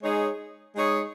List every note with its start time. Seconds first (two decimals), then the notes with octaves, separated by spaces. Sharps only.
0.02 G#3 D#4 G#4 C#5
0.74 G#3 D#4 G#4 C#5